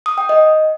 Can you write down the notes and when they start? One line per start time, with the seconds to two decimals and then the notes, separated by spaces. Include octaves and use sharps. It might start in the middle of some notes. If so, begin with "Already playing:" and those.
0.06 D#6
0.18 G5
0.29 D#5